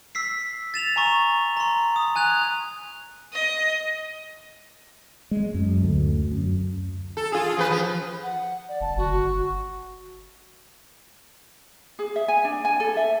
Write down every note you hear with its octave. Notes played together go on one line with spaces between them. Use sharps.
E6 B6 C7
A6 E7 F7
G#5 A#5 C#6
A#5 C6
D#6
G#5 F#6 G#6 F7
D#5
G#3
F#2
D2
F#2
A4
F4 G#4
F3 G4 B4
F3
F#5
D5
F#1 A5
G1 F#4
G#4
E5
G#5
D4
G#5
A4
E5